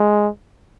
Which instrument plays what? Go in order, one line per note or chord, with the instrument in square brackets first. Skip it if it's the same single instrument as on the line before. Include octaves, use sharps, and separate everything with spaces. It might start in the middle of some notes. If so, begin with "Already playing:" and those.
Already playing: [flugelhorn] G#3